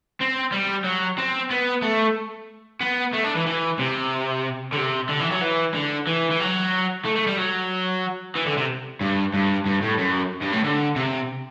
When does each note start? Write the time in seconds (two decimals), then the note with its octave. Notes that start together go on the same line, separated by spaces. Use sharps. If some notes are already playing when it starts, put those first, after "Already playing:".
0.20 C4
0.52 G3
0.84 F#3
1.18 C4
1.51 B3
1.83 A3
2.81 B3
3.13 A3
3.24 D4
3.35 E3
3.46 E3
3.79 C3
4.72 D3
4.76 C3
5.09 D3
5.20 E3
5.31 F#3
5.41 E3
5.74 D3
6.07 E3
6.31 E3
6.40 F#3
7.05 A3
7.16 A3
7.27 G3
7.37 F#3
8.36 E3
8.46 D3
8.58 C3
9.01 G2
9.34 G2
9.66 G2
9.82 A2
9.98 F#2
10.42 G2
10.53 A2
10.64 D3
10.96 C3